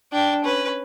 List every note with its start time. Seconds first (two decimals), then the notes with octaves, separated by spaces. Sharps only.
0.12 D4 G5
0.44 C#4 B4